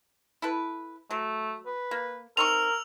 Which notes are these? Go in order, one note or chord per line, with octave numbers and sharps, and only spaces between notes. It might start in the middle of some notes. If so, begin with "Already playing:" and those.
E4 A4 B4
F#3 A3
B4
A#3
C4 D#4 A#4 C#6 E6 F7